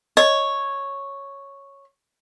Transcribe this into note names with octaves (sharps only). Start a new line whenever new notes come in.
C#5 D#5